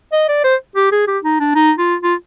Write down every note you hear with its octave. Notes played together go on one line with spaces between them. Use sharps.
D#5
D5
C5
G4
G#4
G4
D#4
D4
D#4
F4
F4